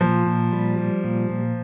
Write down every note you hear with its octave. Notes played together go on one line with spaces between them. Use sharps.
A#2 F3
A#2
G3
G3
A#2
A#2